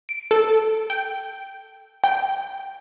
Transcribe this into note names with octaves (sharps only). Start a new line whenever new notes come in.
D7
A4
G5
G5